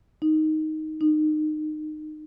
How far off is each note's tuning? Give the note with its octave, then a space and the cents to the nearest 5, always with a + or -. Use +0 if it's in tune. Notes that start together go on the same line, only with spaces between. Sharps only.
D#4 +5
D#4 -25